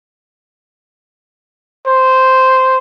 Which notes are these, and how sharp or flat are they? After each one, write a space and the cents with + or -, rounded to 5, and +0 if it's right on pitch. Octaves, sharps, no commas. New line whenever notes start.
C5 -5